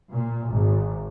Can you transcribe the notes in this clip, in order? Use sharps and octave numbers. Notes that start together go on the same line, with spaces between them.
A#2
G#1